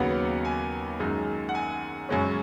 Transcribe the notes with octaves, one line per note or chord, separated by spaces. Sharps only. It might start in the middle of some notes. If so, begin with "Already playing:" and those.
Already playing: D#2 C#3 F#3 B3 F#5
G#5
F#2 D#3 G#3 D#4
F#5
G#5
F#2 C#3 G#3 C#4